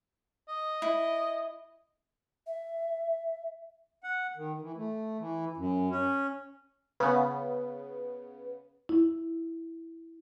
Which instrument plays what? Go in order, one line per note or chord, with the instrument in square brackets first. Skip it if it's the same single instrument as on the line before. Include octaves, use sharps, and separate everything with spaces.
[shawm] D#5
[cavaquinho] E4
[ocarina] E5
[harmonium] F#5
D#3
E3
A3
E3
F#2
C#4
[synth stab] C#3 B3 [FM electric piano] B4
[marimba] E4